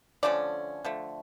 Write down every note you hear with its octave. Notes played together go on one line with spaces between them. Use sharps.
D3 F3 A3 C#4 D5
D3 F3 A3